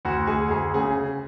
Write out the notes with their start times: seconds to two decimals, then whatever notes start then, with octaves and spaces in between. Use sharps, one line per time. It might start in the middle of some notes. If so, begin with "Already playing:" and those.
0.05 D2 F#4
0.27 D2 G#4
0.50 D2 G#4
0.74 C#3 G#4